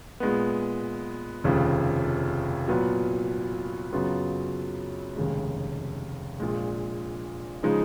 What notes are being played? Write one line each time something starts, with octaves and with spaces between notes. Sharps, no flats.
A#2 G#3 B3
F1 D#2 C#3 F3
A#2 F#3 B3
F#2 C#3 F#3 B3 F4
F1 D#2 C#3 G#3
A#1 A#2 G#3
C#3 F3 G#3 D#4